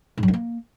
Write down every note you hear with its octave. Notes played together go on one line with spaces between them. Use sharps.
G#2
F#3
G2
A#3